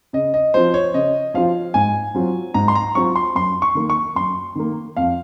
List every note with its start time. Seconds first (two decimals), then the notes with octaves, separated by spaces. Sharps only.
0.13 C#3 D#5
0.34 D#5
0.54 F3 C4 F4 C5
0.74 C#5
0.94 C#3 D#5
1.34 F3 C4 F4 F5
1.74 G#2 G#5
2.15 F#3 C4 F4
2.54 G#2 A#5
2.68 C6
2.75 A#5
2.95 F#3 C4 F4 C#6
3.16 C6
3.35 F#2 C6
3.62 C#6
3.75 D#3 A#3
3.90 C#6
4.15 F#2 C6
4.55 D#3 A#3
4.97 F2 F5